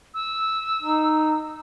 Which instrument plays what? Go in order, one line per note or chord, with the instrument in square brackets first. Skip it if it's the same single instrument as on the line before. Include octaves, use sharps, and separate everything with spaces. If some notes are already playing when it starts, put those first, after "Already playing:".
[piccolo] E6
[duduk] D#4